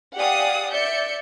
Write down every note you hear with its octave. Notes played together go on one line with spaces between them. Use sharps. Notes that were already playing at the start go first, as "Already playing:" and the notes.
G4 D5 F5 F#5 G#5 D#6
D5 E5 G6 C#7